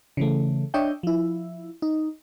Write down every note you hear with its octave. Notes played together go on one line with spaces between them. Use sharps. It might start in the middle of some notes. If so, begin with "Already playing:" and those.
C#3 E3 A3
D4 C#5 D#5 E5 G5
F3 E4
D#4